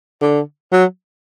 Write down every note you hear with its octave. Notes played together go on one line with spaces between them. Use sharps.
D3
F#3